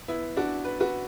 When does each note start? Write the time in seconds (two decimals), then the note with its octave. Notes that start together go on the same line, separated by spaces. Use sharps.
0.08 B3 E4
0.37 D4 F#4
0.65 B4
0.80 F#4 B4